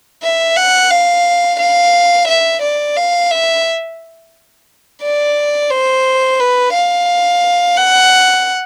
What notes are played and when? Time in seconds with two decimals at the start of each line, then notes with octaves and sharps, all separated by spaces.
0.23 E5
0.57 F#5
0.91 F5
1.60 F5
2.28 E5
2.62 D5
2.97 F5
3.31 E5
5.03 D5
5.71 C5
6.40 B4
6.73 F5
7.77 F#5